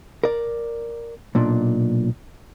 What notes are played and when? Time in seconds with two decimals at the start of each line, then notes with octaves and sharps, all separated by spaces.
0.24 A#4 D5
1.35 B1 A#2 D4